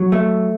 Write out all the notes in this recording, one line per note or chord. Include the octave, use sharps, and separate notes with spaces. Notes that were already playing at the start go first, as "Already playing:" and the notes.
Already playing: F#3
A3